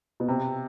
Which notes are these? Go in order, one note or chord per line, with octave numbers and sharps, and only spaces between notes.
B2
C3